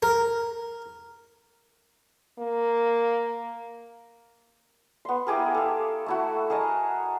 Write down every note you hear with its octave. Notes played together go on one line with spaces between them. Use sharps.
A#4
A#3
B3 C6
E4 G4 G#4 A#4
A4 F5
A3 E4 F#4
G#4 A#4 D#5 A5